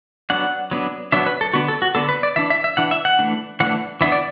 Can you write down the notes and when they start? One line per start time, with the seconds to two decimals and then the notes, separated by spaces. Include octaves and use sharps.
0.30 F#3 B3 D4 F#5
0.71 F#3 B3 D4
1.12 F#3 B3 D4 E5
1.26 B4
1.41 A4
1.53 D3 B3 D4 F#4
1.68 A4
1.82 F#4
1.95 D3 B3 D4 A4
2.09 B4
2.23 D5
2.36 E3 D4 E5
2.50 E5
2.64 E5
2.77 E3 D4 F#5
2.91 E5
3.05 F#5
3.19 E3 A3 D4
3.60 E3 A3 D4 F#5
4.01 E3 B3 D4 E5
4.12 D5